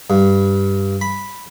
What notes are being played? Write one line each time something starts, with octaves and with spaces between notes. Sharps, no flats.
G2
B5